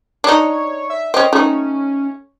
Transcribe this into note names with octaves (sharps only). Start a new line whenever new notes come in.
D4 D#4 C#5
E5
C4 C#4 D#5
A3 C#4 D#4